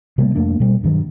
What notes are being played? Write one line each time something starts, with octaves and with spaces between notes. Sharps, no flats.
C3 G3 A3 A#3
F2 A3 A#3 D4
B2 G3
G2 D#3 F#3